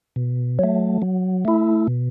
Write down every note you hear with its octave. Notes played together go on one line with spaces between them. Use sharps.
B2
F#3 A3
F#3
A3 E4
B2